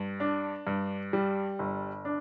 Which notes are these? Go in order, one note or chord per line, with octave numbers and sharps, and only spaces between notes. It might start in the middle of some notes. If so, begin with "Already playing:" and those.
Already playing: G2
D4
G2
G3
G1
D4